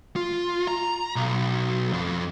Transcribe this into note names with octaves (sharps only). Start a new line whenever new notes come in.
F4
A#5
B1
F2